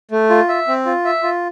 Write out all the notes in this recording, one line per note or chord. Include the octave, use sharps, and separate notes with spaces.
A3
F4
E5
C4
F4
E5
F4